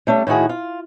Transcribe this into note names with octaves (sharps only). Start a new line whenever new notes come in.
G3 A3 C#4 D4
A2 D#3 E4 F#4 G#4
F4